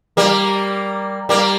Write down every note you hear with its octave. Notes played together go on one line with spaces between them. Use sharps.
G3 A#3
G3 A#3